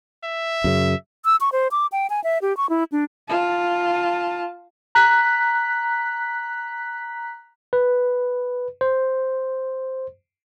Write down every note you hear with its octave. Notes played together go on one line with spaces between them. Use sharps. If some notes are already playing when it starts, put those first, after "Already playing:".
E5
F#2 C#3
E6
C#6
C5
D6
G5
G#5
E5
G4
C#6
E4
D4
F4 A5
A#5 F#6 B6
B4
C5